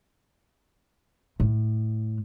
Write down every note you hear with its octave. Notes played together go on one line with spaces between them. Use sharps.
A2